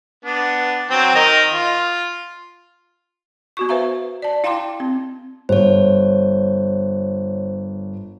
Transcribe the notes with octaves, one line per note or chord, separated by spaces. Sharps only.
B3 D4
F#3 C4 G5
D#3 A#4 D#5
F4
B3 F#4 C#6
B4 C5 E5 F5 A#5
D5 A5
E4 F5 G5 A#5 C6 D6
C4
G1 C5 C#5